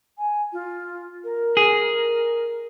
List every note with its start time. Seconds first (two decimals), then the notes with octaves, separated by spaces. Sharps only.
0.18 G#5
0.52 F4
1.24 A#4
1.57 G#4